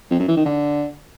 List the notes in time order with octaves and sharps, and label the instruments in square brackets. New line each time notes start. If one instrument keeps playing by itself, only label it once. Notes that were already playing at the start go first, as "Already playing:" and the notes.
[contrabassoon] F2
F#2
E3
D#3
D3